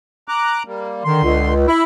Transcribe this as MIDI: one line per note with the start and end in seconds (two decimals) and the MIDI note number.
0.28 0.63 82
0.28 0.63 86
0.28 0.63 90
0.66 1.03 55
0.66 1.03 58
1.04 1.54 50
1.04 1.20 51
1.04 1.54 84
1.23 1.66 37
1.68 1.84 64